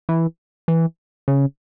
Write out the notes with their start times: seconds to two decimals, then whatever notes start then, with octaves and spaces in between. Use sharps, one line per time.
0.09 E3
0.68 E3
1.28 C#3